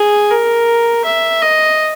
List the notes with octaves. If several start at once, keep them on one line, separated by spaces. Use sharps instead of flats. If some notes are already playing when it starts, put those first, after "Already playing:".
Already playing: G#4
A#4
E5
D#5